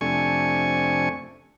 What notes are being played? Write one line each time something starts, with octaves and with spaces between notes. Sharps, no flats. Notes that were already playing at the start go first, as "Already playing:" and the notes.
F2 C3 A3 D4 G#5 C#6